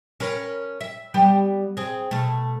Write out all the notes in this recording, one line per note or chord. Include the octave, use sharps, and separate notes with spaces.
C#4 A#4 B4
E5
G3 B3 G4
C4 G#4
B2 A3